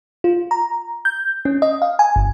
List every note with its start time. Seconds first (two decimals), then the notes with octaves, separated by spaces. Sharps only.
0.24 F4
0.51 A#5
1.05 G6
1.45 C#4
1.62 D#5
1.82 F5
1.99 G#5
2.16 G1